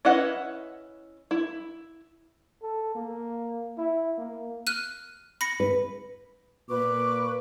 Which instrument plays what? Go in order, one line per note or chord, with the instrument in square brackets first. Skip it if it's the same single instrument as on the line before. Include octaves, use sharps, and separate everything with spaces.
[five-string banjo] C#4 E4 B4 D#5 F#5
E4
[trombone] A4
A#3
E4
A#3
[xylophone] F6 F#6 D#7
B5 A#6 C#7
[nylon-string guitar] B4
[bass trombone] A#2 [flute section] B4 C#6 D6